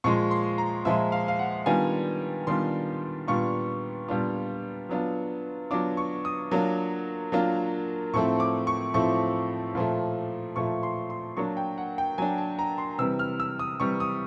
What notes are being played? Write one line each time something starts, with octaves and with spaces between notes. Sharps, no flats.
A#2 F3 G#3 C#6
C6
A#5
A#2 F3 G#3 E5
F5
F5
F#5
D#3 G3 B3 D4 F4 G#5
D#3 G3 B3 D4 F4 C6
A#2 G3 B3 D4 F4 C#6
A#2 G3 B3 D4 F4
F#3 B3 D4 F4
F#3 B3 D4 F4 D6
C#6
D#6
F#3 A#3 D4 F4
F#3 A#3 D4 F4
A2 F3 A3 C4 C#6
D6
C#6
A2 F3 A3 C4 C#6
A#2 F3 A3
A#2 F3 A3 C#6
C6
C6
F#3 A#3 D4 C#6
G5
F#5
G5
F#3 A#3 D4 G#5
A5
A#5
C6
C3 E3 G3 E6
F6
E6
D#6
C3 E3 G3 C#6
D#6